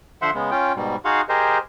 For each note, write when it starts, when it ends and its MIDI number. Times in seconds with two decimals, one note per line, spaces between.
0.22 0.30 50
0.22 0.30 53
0.22 0.30 72
0.22 0.30 76
0.22 0.30 78
0.22 0.30 84
0.34 0.51 49
0.34 0.51 56
0.34 0.51 59
0.51 0.72 61
0.51 0.72 65
0.51 0.72 79
0.76 0.96 44
0.76 0.96 47
0.76 0.96 55
1.05 1.21 63
1.05 1.21 66
1.05 1.21 68
1.05 1.21 77
1.05 1.21 78
1.05 1.21 84
1.29 1.58 67
1.29 1.58 68
1.29 1.58 70
1.29 1.58 72
1.29 1.58 75